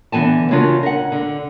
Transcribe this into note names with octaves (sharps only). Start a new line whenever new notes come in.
D3 E3 B3 G#5 A5
C#3 C#4 D4 F4 F#4 A#4
A#4 F#5
D3